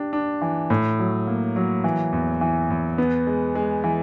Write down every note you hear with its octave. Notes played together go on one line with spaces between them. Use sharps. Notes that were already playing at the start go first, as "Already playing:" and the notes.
Already playing: D4 G4
D4
E3
A2
F#3
A#3
F#3
E3
E2
E3
E2
B3
G#3
G#3
E3